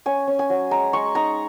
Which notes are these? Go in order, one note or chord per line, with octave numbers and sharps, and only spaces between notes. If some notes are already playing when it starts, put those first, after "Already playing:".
C#4 G#5
C#4
G#5
F#3
G#3 A#5
G#3 C#6
D#4 A#5